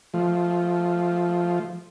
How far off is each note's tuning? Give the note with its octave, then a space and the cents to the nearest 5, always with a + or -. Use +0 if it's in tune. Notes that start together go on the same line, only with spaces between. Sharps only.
F3 +0 A3 -20